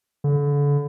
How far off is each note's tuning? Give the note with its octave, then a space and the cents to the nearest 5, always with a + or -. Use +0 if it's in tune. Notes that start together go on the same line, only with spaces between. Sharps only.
D3 -35